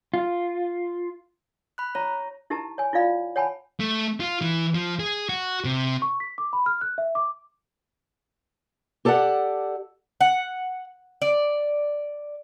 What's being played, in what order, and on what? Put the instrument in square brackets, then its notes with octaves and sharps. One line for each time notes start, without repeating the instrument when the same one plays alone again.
[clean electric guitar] F4
[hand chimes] B5 F#6
[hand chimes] C#5 [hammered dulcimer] A#5
[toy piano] D#4 E4 G4 A#4 A5 A#5
C#5 G#5
E4 F4 D5 F5 B5
C#5 F#5 G#5 A5 B5
[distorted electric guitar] A3
F4
E3
F3
G#4
F#4
C3
[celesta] C#6
B6
D6
B5
F6
F#6
E5
D6
[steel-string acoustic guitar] G4 A4 D5 F5 F#5
[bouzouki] F#5
D5